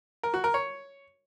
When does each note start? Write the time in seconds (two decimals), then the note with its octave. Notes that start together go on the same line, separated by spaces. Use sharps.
0.23 A#4
0.34 F#4
0.44 A#4
0.54 C#5